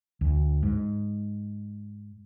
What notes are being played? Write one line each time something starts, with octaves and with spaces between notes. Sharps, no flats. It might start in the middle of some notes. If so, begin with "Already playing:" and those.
D2
G#2